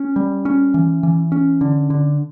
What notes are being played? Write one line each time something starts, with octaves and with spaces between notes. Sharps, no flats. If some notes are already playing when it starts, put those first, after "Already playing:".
Already playing: C#4
G3
C#4
E3
E3
C#4
D3
D3